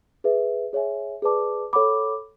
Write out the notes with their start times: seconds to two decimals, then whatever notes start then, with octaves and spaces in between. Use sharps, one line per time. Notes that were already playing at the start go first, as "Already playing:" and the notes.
0.24 G#4 B4 E5
0.73 G#4 C#5 E5 G#5
1.22 G#4 B4 D5 A5 D6
1.73 A4 C#5 F#5 B5 D6